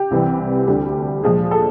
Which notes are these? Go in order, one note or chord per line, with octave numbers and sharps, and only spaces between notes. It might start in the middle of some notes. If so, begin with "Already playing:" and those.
Already playing: G4
C2 C3 E3 G3
D2 D3 G3
A#2 F3 G#3 G#4
A4